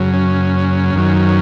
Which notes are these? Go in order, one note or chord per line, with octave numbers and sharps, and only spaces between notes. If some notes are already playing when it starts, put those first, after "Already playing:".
Already playing: F#2 C#3 F#3
C#4
F#2 D#3 F#3